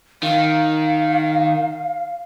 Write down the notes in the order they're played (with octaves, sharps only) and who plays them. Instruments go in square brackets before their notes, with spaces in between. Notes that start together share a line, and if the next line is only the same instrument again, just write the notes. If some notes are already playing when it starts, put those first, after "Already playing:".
[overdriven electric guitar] D#3 [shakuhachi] F5